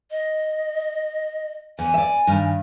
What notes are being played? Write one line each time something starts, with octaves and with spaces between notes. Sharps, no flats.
D#5
E2 G#5
D5 E5
G2 D#3